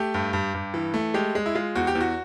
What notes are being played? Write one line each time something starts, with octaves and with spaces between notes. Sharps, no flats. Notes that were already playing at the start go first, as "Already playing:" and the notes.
Already playing: A3 G4
G2
G2
G2
E3
A3
G#3 G4
G#3
E4
G#3 F4
E2 F#4
G4
E2
F#4